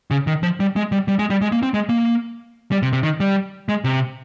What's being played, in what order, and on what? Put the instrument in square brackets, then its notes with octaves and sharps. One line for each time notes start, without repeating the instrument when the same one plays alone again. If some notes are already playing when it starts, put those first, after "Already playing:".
[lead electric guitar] C#3
D#3
F3
G3
G#3
G3
G3
G#3
G3
G#3
A#3
C4
G#3
A#3
G3
C3
C3
D#3
G3
G#3
C3